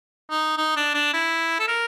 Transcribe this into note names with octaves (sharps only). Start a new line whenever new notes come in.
D#4
D#4
D4
D4
E4
A4
A#4